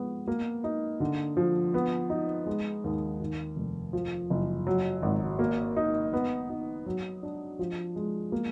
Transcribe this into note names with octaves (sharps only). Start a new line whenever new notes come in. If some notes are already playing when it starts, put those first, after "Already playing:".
Already playing: F3 G#3 B3
A#3
D#4
D3
F3
B3
D#4
G#3
D#2
D#3
F1
F3
F#1
F#3
G#1
A#3
D#4
B3
D#4
F#3
D4
F3
G#3
A#3